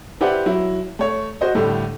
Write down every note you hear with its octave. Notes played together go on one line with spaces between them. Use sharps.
E4 G4 B4 C5 D5 F#5
F#3 E4
A3 C#5
F#4 C5 D#5
A2 D3 G3 A3 G4